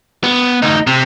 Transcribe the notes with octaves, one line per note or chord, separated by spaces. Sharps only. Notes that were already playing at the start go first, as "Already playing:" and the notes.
B3
D2 D#4
C3